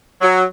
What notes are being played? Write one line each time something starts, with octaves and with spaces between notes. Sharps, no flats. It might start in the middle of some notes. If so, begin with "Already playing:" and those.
F#3